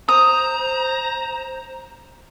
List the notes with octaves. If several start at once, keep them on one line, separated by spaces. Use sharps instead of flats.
C5 A#5 D#6